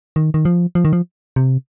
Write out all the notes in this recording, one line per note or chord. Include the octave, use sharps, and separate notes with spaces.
D#3
D#3
F3
F3
D#3
F3
C3